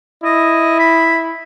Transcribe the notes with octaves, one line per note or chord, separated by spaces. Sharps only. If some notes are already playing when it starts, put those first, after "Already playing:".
E4 D#5
B5